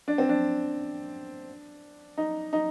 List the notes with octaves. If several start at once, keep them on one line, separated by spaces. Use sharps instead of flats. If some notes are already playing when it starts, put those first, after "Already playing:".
D4
C4
D4
D#4
D#4